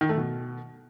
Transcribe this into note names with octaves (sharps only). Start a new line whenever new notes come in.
D#3
A3
B2